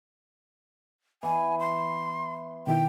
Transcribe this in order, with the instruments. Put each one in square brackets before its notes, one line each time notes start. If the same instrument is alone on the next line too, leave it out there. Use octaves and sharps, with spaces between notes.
[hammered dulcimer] E3 B3 [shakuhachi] G#5
[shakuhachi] C6
[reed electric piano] B2 D#3 E4 [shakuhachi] G5